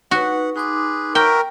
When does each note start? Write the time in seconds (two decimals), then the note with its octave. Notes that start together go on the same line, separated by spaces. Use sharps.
0.11 D#4 F#4 B4 F#5
0.56 D#4 G#4 B4 C6 D6
1.15 F#4 A#4 B4 E5 G5